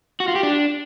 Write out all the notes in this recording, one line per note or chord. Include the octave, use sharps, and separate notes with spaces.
F#4
F4
G4
D4